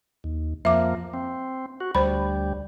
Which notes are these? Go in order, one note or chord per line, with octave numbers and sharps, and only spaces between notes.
D#2
F2 F3 A#3 E5 D6
C4
F#4
D2 G3 C5 B5